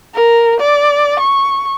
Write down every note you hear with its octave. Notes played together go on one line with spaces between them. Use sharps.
A#4
D5
C#6